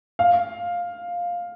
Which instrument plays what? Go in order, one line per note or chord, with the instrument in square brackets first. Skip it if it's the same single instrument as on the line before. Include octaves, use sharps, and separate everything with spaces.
[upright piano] F5